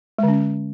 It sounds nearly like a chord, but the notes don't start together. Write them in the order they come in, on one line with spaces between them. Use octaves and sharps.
G#3 D3 C#4